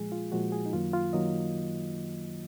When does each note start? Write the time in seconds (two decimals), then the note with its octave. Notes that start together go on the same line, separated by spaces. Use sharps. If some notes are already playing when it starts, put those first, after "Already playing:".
Already playing: A#2 F3 G#3 G#4
0.12 F4
0.32 A#2 F3 G#3 F#4
0.52 G#4
0.66 D#4
0.73 F#2 D#3 F#3 A#3 F4
0.93 F4
1.13 D#3 F#3 A#3 D#5